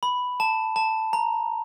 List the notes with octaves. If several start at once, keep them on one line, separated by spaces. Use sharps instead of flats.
B5
A5
A5
A#5